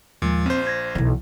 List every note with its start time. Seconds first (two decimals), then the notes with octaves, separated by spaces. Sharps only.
0.22 D#2 A#2 F3 G#3
0.46 A#1 C4 C5
0.67 G#6 A#6
0.95 B1 E3